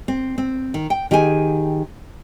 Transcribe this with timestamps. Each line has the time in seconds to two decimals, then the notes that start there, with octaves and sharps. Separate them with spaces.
0.08 C4
0.38 C4
0.74 D#3
0.90 G5
1.11 D#3 G4 G#4 G#5